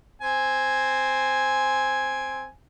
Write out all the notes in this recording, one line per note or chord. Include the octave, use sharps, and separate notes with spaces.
C4 G#5